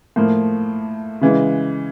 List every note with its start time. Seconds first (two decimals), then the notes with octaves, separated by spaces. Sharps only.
0.16 A2 F3 A#3
1.21 C#3 E3 G#3